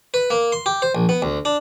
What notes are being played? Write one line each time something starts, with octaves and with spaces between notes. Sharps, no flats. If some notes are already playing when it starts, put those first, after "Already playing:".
B4
A#3
C6
G4
C5
A#1
B3
D2
D4